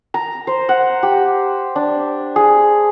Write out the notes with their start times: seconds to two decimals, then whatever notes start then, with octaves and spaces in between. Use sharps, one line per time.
0.14 A#5
0.47 C5
0.69 F#5
1.03 G4
1.76 D4
2.36 G#4